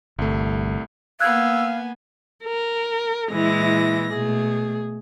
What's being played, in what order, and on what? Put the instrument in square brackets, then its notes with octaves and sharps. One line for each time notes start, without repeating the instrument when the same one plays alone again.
[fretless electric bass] G1 [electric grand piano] C2 A3
[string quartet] A#3 B3 G#5 [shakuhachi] F5 [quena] E6 [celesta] F#6 G#6
[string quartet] A#4
[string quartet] A#2 E3 A#6 [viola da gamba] G#3 E4
[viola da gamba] B2 A3 [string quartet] G#4